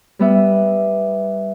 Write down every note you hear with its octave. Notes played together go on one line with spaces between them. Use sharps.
G3 B3 E5